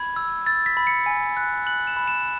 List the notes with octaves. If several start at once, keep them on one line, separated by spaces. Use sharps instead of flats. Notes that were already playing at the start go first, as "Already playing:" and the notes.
Already playing: B5 G#6
E6
E6 A6
B6
B5
C#7
G#5
F#6
F#6 F#7
E7
B5
E7